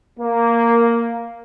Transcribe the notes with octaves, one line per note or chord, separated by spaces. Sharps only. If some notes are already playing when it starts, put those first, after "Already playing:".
A#3